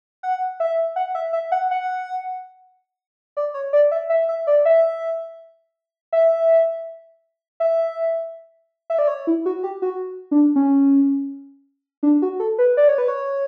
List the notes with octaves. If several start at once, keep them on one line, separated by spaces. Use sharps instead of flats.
F#5
E5
F#5
E5
E5
F#5
F#5
D5
C#5
D5
E5
E5
E5
D5
E5
E5
E5
E5
D5
C#5
E4
F#4
G4
F#4
D4
C#4
D4
F#4
A4
B4
D5
C#5
B4
C#5